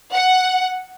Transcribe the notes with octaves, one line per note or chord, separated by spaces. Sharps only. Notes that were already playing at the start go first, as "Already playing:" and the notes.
F#5